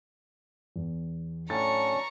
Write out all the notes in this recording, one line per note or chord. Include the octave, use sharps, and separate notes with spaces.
E2
A2 F#3 C#4 D4 A#5 B5 C#6 A6